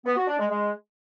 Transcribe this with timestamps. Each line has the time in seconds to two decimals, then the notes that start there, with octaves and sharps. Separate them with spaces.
0.05 B3
0.16 F#4
0.28 D4
0.39 G#3
0.50 G#3